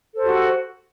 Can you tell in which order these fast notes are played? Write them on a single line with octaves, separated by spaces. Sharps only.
A4 C5 G4 F#4